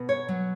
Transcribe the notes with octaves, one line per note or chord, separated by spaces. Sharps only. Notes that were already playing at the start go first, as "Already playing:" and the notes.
Already playing: B2
C#5
F#3